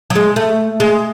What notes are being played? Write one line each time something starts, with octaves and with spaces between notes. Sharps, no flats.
F#3
G#3
A3
G#3